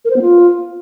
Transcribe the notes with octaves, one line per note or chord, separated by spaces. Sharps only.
A#4
C5
B3
F4